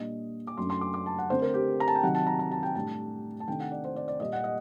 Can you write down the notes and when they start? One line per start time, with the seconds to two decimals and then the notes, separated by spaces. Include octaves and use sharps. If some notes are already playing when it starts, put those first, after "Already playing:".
Already playing: A#2 G3 D4 D#5
0.47 D6
0.57 F#2 F#3 A3 D4 C6
0.70 C6
0.81 D6
0.94 D6
1.06 A5
1.18 F#5
1.30 D3 A3 C4 C5
1.42 A#4
1.54 G4
1.80 A#5
1.88 A5
1.95 G5
2.03 C3 D#3 F#3 F#5
2.15 A5
2.27 A#5
2.39 A#5
2.51 A5
2.63 G5
2.75 A2 G3 D4 A5
3.40 A5
3.48 C3 D#3 A3 D4 G5
3.60 F#5
3.72 D5
3.85 C5
3.96 D5
4.08 D5
4.20 A#2 G3 A#3 D#5
4.33 F#5
4.44 D#5